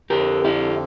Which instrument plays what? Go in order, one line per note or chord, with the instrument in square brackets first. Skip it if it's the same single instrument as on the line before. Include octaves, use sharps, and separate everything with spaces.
[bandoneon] F2 D3 F3 [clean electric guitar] G4 A#4
[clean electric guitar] E4 G4